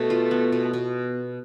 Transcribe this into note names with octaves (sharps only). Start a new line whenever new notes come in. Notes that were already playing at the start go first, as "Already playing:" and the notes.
Already playing: B2 A3
F4
B3
B2
B2